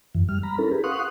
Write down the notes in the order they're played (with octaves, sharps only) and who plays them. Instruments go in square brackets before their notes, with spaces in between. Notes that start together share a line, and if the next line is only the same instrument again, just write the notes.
[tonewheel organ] F#2 E3
G3 F6
A#5 B5
C#4 E4 A4 A#4
G4 G#4 B4
F5 F#5 C6 C#6 D#6 F#6